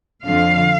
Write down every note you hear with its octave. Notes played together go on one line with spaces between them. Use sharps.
F2 D3 F3 F5